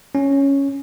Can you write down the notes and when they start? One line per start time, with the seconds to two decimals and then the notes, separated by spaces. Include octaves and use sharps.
0.15 C#4